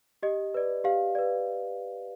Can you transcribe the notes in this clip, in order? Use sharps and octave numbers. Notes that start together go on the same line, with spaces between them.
G4 D#5
B4 D5
G4 F5
B4 D5